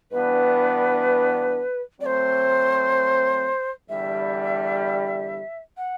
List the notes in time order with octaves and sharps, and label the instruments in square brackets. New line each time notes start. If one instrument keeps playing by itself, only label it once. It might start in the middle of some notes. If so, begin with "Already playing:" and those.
[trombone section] G2 E3 B3 D4 [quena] B4
[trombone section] F#3 A3 C4 [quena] D5
[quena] C5
[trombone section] E2 D3 G3 [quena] E5
[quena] F#5